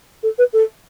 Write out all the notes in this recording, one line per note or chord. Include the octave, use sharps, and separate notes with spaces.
A4
B4
A4